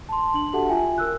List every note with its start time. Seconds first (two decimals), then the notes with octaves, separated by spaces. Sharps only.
0.09 A5 C6
0.34 D4 F#7
0.52 F#4 G4 A4 E5 F#5 A5
0.69 F4 E5 G5 G#5
0.98 A#4 E6 F#6